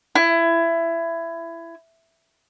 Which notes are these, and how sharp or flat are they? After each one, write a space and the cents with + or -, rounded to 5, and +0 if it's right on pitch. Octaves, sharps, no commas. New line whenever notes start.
E4 +20